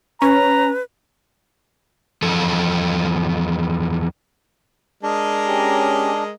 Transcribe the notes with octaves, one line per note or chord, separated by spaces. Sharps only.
C#4 B4 A#5
E2 F3 A4
G#3 D4 A#4 D#5
C#4 G4 A#5